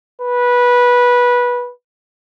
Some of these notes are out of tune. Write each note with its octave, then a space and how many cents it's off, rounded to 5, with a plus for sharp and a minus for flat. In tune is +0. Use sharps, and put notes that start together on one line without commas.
B4 -15